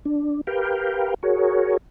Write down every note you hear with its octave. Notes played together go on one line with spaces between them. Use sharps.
D4
G4 A#4 B4 F5 G5
F#4 G#4 A#4 C#5